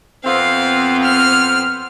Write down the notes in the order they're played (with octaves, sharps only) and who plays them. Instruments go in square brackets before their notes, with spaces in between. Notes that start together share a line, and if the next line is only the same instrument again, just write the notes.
[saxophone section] F2 B3 C4 [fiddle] F5
[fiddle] F6